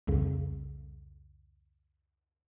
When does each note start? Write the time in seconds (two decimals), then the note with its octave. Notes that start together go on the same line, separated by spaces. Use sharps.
0.07 C2 F2 C#3